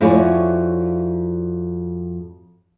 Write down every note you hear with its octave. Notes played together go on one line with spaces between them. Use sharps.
F2 E4 F#4 C#5 D5 G#5